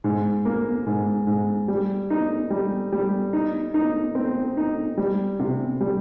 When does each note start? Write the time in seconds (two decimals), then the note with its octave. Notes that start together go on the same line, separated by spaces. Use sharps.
0.04 G#2
0.45 A#3
0.86 G#2
1.27 G#2
1.68 G3
2.10 D#4
2.50 G3
2.92 G3
3.33 D#4
3.74 D#4
4.15 C4
4.57 D#4
4.97 G3
5.39 C3
5.81 G3